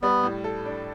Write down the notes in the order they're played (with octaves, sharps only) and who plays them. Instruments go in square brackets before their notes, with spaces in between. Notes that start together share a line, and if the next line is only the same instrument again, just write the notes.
[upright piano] G3 [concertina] B3
[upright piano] A2
A4
D4